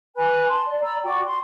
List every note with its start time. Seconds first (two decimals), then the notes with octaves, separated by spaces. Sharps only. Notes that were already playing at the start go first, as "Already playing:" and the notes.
0.16 B4 G#5 B5 F#6
0.48 A5 C6
0.67 D5
0.83 D5 A#5 B5 E6
1.04 F#4 D5 G5 D6
1.25 C6